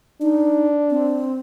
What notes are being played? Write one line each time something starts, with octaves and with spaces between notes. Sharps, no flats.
D4 D#4
C4